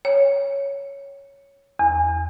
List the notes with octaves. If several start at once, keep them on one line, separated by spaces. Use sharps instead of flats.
C#5
E2